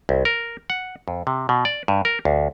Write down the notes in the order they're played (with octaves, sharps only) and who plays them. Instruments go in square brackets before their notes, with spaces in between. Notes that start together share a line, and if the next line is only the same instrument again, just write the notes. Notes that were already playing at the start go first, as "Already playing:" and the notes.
[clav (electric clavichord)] C2
A#4
F#5
F2
C3
B2
D5
G2
A#4
D2